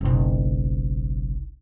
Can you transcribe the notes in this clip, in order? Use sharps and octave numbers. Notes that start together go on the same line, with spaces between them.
F#1 B1